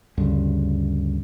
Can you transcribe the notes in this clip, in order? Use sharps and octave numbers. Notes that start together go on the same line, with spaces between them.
D2 G2 C#3